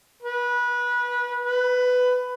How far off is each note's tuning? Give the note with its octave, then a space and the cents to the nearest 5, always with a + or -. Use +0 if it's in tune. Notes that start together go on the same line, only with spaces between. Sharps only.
B4 -25
B4 +15